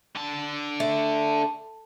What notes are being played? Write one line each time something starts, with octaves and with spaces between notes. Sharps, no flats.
D3 A5
A3